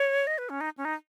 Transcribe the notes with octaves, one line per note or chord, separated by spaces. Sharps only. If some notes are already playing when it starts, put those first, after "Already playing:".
Already playing: C#5
D#5
B4
C#4
D#4
C#4
D#4